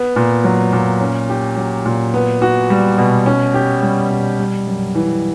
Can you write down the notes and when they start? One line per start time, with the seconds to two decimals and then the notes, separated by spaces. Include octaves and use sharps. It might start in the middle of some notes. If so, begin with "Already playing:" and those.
Already playing: B3
0.16 A#2
0.44 F#3
0.73 A#2
1.01 C#4
1.29 G4
1.57 F#3
1.86 A#2
2.14 B3
2.42 F#4
2.70 G3
2.98 B2
3.26 C#4
3.54 G4
3.83 G3
4.10 B2
4.39 G3
4.67 F#2
4.95 E3